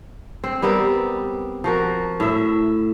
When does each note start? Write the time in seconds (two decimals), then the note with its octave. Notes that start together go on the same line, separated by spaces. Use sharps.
0.44 C4
0.62 G3 B3 C4 A#4
1.64 F3 F#4 A#4
2.20 A2 E5